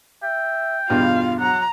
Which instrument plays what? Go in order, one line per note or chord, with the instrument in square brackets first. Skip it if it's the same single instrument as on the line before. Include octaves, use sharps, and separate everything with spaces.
[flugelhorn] E5 [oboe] G5
[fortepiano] E2 G2 B2 [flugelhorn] F4 [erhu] F5
[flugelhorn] F#3 [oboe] F#5 [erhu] A#5